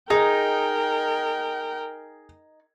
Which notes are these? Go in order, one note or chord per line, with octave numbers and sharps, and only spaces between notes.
D#4 G#4 A#4 G5